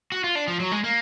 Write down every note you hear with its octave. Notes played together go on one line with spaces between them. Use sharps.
F#4
F4
D4
F3
F#3
G#3
A#3